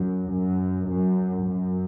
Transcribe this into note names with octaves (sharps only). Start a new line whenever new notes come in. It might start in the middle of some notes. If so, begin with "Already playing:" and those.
Already playing: F#2
F#2
F#2
F#2